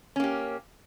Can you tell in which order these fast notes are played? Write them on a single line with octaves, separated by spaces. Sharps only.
C#4 A#3 G4